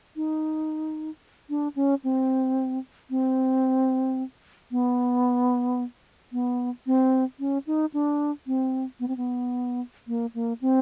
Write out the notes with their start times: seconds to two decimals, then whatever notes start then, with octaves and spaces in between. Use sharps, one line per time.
0.16 D#4
1.50 D4
1.76 C#4
2.04 C4
3.10 C4
4.71 B3
6.32 B3
6.86 C4
7.39 C#4
7.67 D#4
7.94 D4
8.47 C4
9.00 B3
9.08 C4
9.17 B3
10.08 A#3
10.34 A#3
10.61 C4